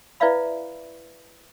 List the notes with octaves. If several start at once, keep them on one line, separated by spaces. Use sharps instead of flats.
E4 B4 D5 E5 F5 B5